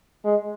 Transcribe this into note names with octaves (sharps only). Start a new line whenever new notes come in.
G#3